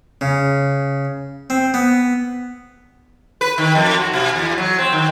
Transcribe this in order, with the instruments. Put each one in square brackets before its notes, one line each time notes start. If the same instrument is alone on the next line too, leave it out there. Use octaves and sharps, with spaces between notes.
[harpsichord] C#3
C4
B3
[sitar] B4
D#3
F2
F#4
B2
E2
F#3
C4
D#3